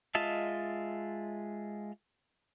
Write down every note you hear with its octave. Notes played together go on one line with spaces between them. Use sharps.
G#3 F4 D#5 E5 A5